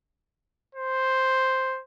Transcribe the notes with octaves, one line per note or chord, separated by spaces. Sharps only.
C5